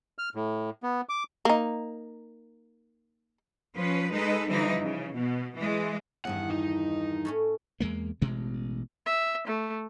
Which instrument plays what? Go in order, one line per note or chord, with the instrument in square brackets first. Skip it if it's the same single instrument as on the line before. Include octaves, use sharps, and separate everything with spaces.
[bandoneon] F6
A2
B3
D6
[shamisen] A#3 D#4
[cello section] F3 C#4 B4
G#3 D#4 A4 B4
D3 E3 F3 G3 D#4 E4
C#3
B2
E3 G#3
[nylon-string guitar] E2 G2 D#3 [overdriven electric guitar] F#5
[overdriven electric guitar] D#4
[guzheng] A2 A3 C#4
[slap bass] E2 G#3 A#3
A1 B2 G#3
[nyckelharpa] E5
A3